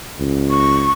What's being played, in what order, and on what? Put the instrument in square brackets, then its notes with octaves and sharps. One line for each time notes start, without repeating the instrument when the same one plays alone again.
[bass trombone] C#2
[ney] C#6